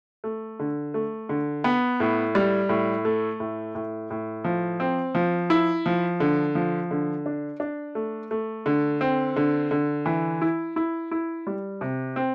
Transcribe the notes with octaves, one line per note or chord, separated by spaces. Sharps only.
A3
D3
A3
D3
B3
A2
G3
A2
A3
A2
A2
A2
F3
C4
F3
E4
F3
D3
F3
D3
D4
D4
A3
A3
D3
C4
D3
D3
E3
E4
E4
E4
G3
C3
C4